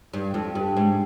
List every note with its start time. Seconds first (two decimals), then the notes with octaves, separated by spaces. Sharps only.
0.13 G2
0.34 F2
0.55 G2
0.76 G#2